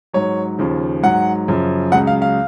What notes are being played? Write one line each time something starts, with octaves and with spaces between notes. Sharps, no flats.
G#2 F#3 C#5
D#2 C#3 F3
G#2 F#3 F#5
F#2 C#3 F3
C#2 C#3 F#3 F#5
F5
F5